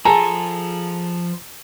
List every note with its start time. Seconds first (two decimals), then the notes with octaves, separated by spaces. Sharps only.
0.05 F3 G#4 A4 A#5